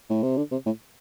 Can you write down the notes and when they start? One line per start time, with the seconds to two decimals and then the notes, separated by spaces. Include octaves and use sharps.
0.10 A2
0.23 C3
0.37 D3
0.51 C3
0.66 A2